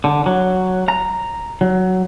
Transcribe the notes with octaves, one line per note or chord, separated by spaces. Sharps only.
D3
F#3
A#5
F#3